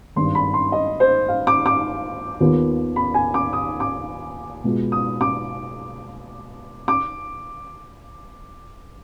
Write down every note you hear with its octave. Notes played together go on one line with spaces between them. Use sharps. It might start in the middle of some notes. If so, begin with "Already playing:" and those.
G#1 G2 D#3 C6
B5
C6
D#5
C5
F5
D6
D6
D#2 D#3 B3 F4
B5
G#5
D6
D#6
D6
B2 G#3 B3 F4
D#6
D6
D6